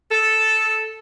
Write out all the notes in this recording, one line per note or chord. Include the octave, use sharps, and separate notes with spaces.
A4